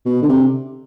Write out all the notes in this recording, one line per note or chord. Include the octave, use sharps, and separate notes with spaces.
B2
D3
C3